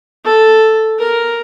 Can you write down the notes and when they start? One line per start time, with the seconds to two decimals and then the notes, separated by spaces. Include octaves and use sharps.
0.25 A4
0.98 A#4